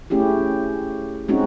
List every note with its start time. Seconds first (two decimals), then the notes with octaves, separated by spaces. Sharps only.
0.10 A3 C#4 E4 G4 G#4
1.29 G#3 C4 C#4 D#4 F#4